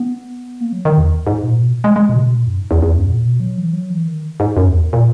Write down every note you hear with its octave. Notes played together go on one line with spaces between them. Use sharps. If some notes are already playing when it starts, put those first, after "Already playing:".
Already playing: B3
A#3
F#3
D#3
E2
G#2
A#2
B2
G#3
G#3
A#2
C#3
B2
A#2
F#2
G#2
E2
E2
F#2
A#2
B2
F#3
E3
F#3
E3
D#3
G#2
F#2
E2
A#2